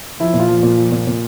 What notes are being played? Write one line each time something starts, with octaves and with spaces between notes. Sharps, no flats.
F3 E4
A#2
F4
F3
A#2 F4
F3
A#2
A#2